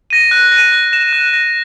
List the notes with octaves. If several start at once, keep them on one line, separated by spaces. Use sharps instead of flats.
A#6 D#7
F#6
A#6 D#7
F#6
A#6 E7
F#6
A#6 E7